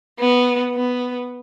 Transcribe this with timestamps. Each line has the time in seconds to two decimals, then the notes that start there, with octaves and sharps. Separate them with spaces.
0.20 B3
0.75 B3